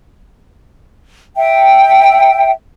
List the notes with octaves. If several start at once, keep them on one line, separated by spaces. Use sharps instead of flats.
E5 G5